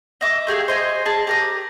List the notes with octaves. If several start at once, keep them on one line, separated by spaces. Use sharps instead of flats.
D#5 E5 D6
A3 G4 G#4 F5
C5 D#5 G#5
G#4 D5 A5
G4 A#4 D#6